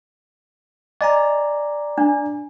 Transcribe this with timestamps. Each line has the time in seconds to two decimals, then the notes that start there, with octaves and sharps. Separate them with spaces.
1.01 D5 D#5 G#5 A#5
1.98 D4